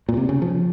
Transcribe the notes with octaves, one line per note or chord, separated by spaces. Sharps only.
A#2
C3
C#3
F3